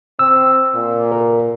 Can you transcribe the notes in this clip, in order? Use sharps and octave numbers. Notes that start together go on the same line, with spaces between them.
C4 E6
A#2
A#4